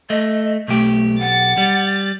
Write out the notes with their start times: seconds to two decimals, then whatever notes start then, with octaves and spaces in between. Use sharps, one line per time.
0.10 A3 D#5
0.68 B1 A3 G4
1.20 F#5 A6
1.57 G3